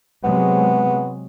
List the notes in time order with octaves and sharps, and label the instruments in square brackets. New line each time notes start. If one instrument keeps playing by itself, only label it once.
[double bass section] C3 F#3 G#3 [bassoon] B3